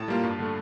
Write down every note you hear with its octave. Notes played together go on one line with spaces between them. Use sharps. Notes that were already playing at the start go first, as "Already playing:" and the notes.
Already playing: A2 A5
G3 A#3 F4
G2
D3 A3